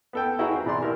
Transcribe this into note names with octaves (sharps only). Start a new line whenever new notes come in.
B3 A4 G5
E4 F#4 G#4 A#5
C4 C5
B2 E3 G#4 D5 A#5 C6
E4 G4 A#4